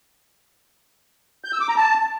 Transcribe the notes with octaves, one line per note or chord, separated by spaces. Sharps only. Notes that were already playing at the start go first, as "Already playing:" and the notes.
G6
E6
D6
A#5
A5